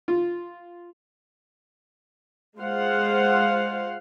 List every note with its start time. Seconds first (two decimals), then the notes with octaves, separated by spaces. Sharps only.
0.08 F4
2.58 G#3 F4 C5 F5 F#5